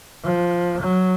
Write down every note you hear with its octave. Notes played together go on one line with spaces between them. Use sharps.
F3
F#3